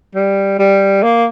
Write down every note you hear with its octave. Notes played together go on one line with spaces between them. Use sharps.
G3
G3
A#3